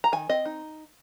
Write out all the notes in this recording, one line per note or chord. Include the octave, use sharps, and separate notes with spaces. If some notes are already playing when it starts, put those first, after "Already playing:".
A#5
D#3 G#5
C4 D#5
D#4